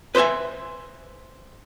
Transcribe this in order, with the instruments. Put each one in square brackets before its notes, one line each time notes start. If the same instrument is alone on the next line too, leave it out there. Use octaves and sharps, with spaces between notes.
[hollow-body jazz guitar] B4 C5 D#5 E5 G#5